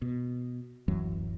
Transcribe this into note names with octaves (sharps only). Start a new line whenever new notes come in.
B2
D1 F#2 E3 F#3